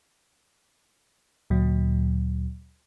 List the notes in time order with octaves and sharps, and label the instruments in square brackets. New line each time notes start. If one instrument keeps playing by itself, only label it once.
[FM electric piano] D2 A#2 F#3